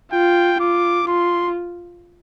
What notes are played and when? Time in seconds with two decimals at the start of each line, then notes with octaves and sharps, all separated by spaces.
0.12 F4 G5
0.60 F4 D6
1.07 F4 C6